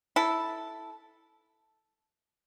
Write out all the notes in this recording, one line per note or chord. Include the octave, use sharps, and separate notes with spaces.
E4 A4